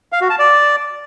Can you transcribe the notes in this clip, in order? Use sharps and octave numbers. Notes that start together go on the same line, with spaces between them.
F5
F#4
A5
D5